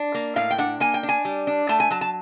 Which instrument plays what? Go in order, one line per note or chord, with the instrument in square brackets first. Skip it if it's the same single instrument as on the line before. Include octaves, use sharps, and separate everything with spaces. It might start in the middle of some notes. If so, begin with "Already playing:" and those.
Already playing: [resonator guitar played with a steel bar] D4
A#3
A2 F5
G5
D4 F#5
A#3 G#5
G5
D4
G#5
G3
D4
A3 A5
G#5
F#3 A5
A5